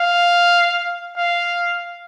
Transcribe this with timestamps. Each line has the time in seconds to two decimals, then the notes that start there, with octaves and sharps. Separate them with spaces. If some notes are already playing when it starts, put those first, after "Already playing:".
Already playing: F5
1.17 F5